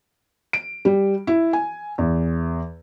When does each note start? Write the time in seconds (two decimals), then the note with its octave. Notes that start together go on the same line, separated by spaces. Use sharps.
0.53 D7
0.85 G3
1.27 E4
1.53 G#5
1.98 E2